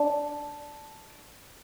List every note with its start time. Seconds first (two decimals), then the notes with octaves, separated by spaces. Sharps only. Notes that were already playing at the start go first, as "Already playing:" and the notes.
Already playing: D4